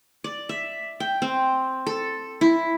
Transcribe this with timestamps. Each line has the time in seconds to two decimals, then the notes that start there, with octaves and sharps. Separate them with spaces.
0.24 D5
0.49 E5
1.00 G5
1.22 C4
1.86 A4
2.41 E4